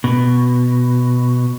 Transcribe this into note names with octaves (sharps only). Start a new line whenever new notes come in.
B2